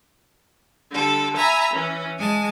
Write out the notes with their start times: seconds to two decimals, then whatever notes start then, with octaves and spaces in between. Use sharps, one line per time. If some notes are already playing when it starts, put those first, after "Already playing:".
0.91 D3 G3 A4
1.36 E5 G#5 A#5 B5
1.73 E3 C#4
2.18 G#3 G#5 A5